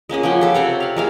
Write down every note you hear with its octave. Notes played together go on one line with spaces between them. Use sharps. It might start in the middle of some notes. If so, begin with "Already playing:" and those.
G#3 A#3 C#4 G#4
C#3 F3 F#5 G5
G4 A4
C3 C4 C#5 F#5
F5 F#5
G#3 A#3 F5